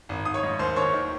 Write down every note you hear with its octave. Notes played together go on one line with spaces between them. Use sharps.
G#1
G#1 D#6
C#5 C#6
G#2
D#2 C5 C6
D#2 C#5 C#6
D#3